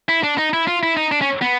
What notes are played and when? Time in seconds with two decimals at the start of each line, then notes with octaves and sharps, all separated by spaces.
0.09 E4
0.23 D4
0.38 D#4
0.53 E4
0.67 F4
0.83 E4
0.97 D#4
1.11 D4
1.21 C#4
1.42 B3